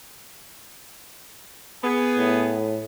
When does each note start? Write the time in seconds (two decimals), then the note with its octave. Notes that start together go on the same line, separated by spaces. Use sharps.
1.83 B3 G#4
2.18 A2